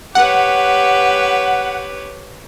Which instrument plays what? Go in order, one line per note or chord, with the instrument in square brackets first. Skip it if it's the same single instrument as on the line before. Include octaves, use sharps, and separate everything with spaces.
[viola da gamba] G4 B4 C#5 [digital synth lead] F#5